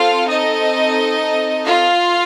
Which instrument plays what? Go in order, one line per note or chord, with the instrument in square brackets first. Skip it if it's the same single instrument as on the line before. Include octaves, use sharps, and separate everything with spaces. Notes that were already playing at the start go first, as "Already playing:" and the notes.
Already playing: [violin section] C4 F4 A4 F5
D#4 D#5
F4 F5